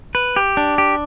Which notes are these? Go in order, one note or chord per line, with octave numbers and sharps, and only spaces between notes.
B4
G4
D4
G4